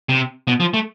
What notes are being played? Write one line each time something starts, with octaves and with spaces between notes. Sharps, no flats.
C3
B2
F3
A3